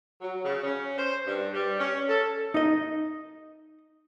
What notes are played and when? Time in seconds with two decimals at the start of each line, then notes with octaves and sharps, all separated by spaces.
0.21 F#3
0.44 C#3
0.63 C#4
0.97 C5
1.26 G2
1.54 G3
1.79 C#4
2.08 A4
2.54 D#4 D#5